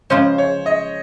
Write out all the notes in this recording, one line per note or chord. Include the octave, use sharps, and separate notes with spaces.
C#3 F3 G#3 C#4 C5
C#5
D#5